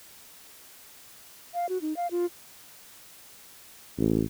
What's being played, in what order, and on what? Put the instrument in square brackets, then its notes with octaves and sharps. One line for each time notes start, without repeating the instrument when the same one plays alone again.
[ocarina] F5
F#4
D#4
F5
F4
[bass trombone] A1